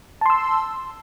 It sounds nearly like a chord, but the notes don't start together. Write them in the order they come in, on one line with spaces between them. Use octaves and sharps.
A5 C6 E6